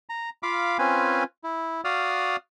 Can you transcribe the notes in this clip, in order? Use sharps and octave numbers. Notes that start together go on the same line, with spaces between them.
A#5
F4 F5 B5 D6
C4 C#4 F4 B4 G#5
E4
F#4 D5 F5 D#6 F6